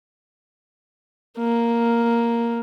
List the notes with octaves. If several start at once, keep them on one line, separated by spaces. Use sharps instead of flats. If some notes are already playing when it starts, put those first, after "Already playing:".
A#3